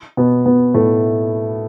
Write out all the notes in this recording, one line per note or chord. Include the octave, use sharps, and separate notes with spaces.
B2 B3
B2 B3
A2 A3